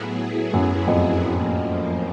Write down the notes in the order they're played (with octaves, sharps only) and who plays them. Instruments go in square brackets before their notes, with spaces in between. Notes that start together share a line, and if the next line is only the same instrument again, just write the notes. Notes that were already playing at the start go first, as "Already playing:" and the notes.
Already playing: [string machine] A2 F#3 B3 E4 G#4
[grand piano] F#2
F2
[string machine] A2 F3 A#3